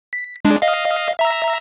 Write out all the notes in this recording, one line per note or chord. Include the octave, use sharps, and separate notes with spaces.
B6
G#3 D4
D#5 F5
E5 A#5